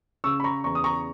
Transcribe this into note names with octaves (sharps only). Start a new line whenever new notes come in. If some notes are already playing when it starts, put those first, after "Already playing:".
C#3 C#6 E6
B5
A#5 C#6
E2 A#5 C#6
D#6
A#5 C#6